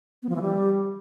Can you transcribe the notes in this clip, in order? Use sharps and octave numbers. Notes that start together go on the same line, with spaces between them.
B3
F3
E3
G3